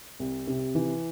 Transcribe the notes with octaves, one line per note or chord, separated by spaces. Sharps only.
C2
C3
E3